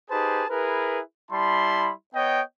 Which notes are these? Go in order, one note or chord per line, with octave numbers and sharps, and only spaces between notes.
D#4 G4 G#4 B4 C5 A5
E4 G#4 A#4 B4
G3 E4 A5 B5 C6
B3 C#5 D#5 G5